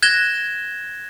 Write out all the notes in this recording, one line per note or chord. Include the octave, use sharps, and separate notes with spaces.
F#6 G#6 A#6 E7 G7